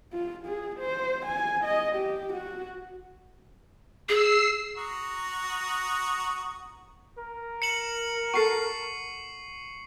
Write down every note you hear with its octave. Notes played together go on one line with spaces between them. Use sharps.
F4
G#4
C5
G#5
D#5
G4
F#4
G#4 E6 C7
F#4 A#5 D#6
A#4
C#7 E7 F#7
F#4 A4 C#6 C7